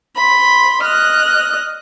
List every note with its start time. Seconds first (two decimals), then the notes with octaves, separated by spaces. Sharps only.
0.16 B5 C6
0.83 D#5 F6 F#6